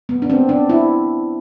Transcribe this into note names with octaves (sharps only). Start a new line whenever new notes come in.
B3
D4
C4
D4
E4